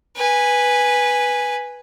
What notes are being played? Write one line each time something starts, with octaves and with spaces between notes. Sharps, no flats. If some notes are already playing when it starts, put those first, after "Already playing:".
B4 G#5